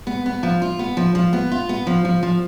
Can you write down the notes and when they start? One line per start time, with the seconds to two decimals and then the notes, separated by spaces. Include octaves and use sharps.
0.07 B3
0.26 B3
0.43 F3
0.62 F4
0.79 B3
0.97 F3
1.15 F3
1.33 B3
1.51 F4
1.69 B3
1.87 F3
2.05 F3
2.23 F3